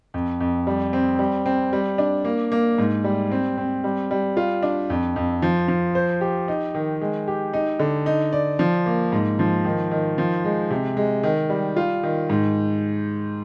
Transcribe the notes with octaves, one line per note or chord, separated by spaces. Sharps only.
F2
F2
G3
C4
G3
C4
G3
D4
A#3
A#3
G#2
G3
C4
C4
G3
G3
F4
D4
F2
F2
F3
F3
C5
G4
D#4
D#3
G#3
G4
D#4
D3
D#4
D5
F3
A#3
G#2
F3
D#3
D#3
F3
G#3
C3
G#3
D#3
G3
F4
D#3
G#2